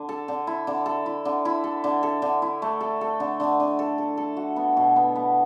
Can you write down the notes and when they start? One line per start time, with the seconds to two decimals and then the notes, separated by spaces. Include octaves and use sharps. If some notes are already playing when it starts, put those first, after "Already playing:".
Already playing: D3
0.09 A4
0.28 D3
0.47 E4
0.67 D3
0.86 A4
1.06 E4
1.25 D3
1.45 E4
1.64 A4
1.84 D3
2.03 A4
2.22 D3
2.42 E4
2.62 A3
2.81 A4
3.01 A4
3.20 D3
3.40 D3
3.60 D3
3.79 A4
3.98 A4
4.17 A4
4.37 F#4
4.56 B3
4.77 B2
4.96 B3
5.16 B3